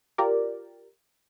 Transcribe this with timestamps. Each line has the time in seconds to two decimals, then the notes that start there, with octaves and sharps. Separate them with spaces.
0.18 F4 G4 A#4 D5